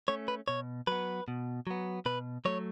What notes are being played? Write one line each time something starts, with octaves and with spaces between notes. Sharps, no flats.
A3 C#4 C#5
B4
B2 C#5
F#3 B3 B4
B2
F#3 B3
B2 B4
F#3 A3 C#5